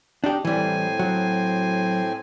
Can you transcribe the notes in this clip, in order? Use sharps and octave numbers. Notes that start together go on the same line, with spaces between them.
D4 D#4 G4
A2 E3 G3 C4 G#5
F#3